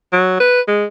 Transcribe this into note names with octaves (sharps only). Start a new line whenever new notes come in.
F#3
B4
G#3